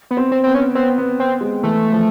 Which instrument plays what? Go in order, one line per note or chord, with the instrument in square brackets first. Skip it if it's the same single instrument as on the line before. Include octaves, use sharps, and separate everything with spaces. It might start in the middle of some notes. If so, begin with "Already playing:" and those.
[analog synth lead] B3
[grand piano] C4
[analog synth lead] C4
[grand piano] B3 [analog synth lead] C4
[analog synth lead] C#4
[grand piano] B3 [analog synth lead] C4
[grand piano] B3
[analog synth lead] C4
[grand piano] G#3
[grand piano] E3 [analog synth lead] A3
[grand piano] F3